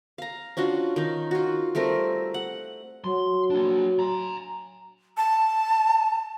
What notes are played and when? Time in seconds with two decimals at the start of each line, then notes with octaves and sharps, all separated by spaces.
0.18 F5 A#5
0.57 C#4 D4 F4 F#4
0.96 D#3 D#4
1.31 F4 F#4
1.75 G3 A3 C4 A#4
2.34 F#5
3.04 F#3 C6
3.50 A#3 D4
3.99 A#5 C6
5.17 A5